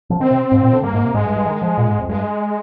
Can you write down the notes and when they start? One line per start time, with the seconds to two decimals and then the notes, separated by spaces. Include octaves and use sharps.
0.10 F3
0.20 D#3 C4
0.31 C3
0.52 G#2
0.62 A#2
0.73 D3
0.83 G2 A#3
0.94 G#2
1.04 C3
1.14 G#2 G#3
1.25 G2
1.36 G2
1.46 D#3
1.62 F3
1.78 A#2
1.88 G#2
1.99 F2
2.09 G2 G#3